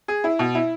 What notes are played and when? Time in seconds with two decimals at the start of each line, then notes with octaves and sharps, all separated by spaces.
0.08 G#4
0.24 E4
0.39 B2
0.55 E4